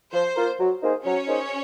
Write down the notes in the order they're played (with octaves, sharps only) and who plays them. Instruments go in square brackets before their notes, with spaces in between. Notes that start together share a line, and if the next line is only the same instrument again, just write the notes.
[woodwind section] F3 [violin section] C5
[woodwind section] A#3 F4 A#4
F#3
A#3 D#4 G#4 C5
[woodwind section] F#3 [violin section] C#4 C#5
[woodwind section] A#3 D#4 G#4 C5